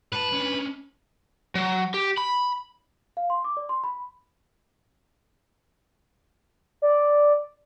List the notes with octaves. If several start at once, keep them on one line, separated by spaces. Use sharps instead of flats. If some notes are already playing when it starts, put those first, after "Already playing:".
A2 B4 A5
C#4 D4
F#3
G4
B5
F5
C6
D6
D5
C6
B5
D5